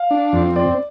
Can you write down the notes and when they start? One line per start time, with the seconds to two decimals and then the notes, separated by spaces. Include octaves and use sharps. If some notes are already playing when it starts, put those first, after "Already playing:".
Already playing: F5
0.11 D4
0.33 F2
0.56 C4 D5